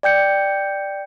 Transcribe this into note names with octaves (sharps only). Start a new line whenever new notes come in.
D5 G5 G6 C#7